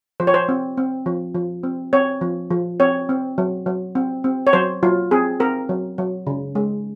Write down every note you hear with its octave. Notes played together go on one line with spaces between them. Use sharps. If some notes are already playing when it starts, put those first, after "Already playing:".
F3 C5
C#5
C5
C4
C4
F3
F3
C4
C4 C#5
F3
F3
C4 C#5
C4
F#3
F#3
C4
C4
C#5
F#3 C5
F#3 F4
C4 G#4
C4 A#4
F#3
F#3
C#3
G#3